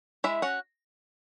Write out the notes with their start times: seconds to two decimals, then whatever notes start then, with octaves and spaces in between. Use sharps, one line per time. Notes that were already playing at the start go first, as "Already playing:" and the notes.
0.24 G#3 E4 E5
0.42 C#4 F#4 F#5